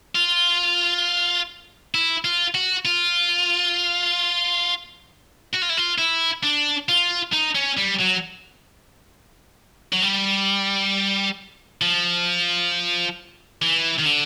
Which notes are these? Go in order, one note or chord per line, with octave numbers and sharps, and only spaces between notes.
F4
E4
F4
F#4
F4
F#4
F4
E4
F4
E4
D4
F4
D#4
C#4
G3
F#3
F#3
G3
F3
E3
D#3
D3